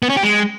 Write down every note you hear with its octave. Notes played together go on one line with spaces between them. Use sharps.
B3
C#4
G4
G#3